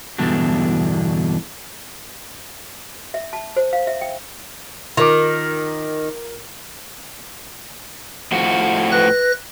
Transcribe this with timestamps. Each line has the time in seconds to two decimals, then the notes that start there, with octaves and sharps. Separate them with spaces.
0.18 E2 G2 B2 D3 D4
3.14 E5
3.33 A5
3.56 C5
3.73 F5
3.87 E5
4.01 G5
4.97 D#3 F4 A#4 D6
8.32 A2 F3 F#4
8.92 B4 F#6 A#6